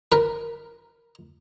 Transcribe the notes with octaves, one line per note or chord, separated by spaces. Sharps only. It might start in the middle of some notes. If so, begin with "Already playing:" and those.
A#4 B4